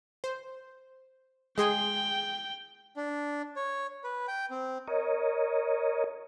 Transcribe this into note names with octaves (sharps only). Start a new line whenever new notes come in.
C5
G#3 G#4 G5 C6
D4
C#5
B4
G5
C4
A#4 C#5 D#5